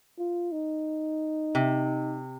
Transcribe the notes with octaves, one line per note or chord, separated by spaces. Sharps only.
F4
D#4
C3